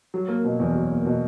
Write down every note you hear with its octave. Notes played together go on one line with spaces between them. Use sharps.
F#3
A#3
B2
E2
F#3
A#3
B2